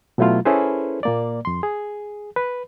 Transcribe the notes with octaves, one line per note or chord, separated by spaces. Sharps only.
B2 F#3 A3 E4 F4
C#4 E4 G#4 A4 B4 C5
A#2 A#3 D5
F2 C6
G#4
B4